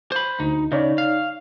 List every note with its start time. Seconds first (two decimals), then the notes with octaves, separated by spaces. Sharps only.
0.12 C5 B5
0.40 D2 D#4
0.72 C#3 D#4 C#5 D5
0.98 F5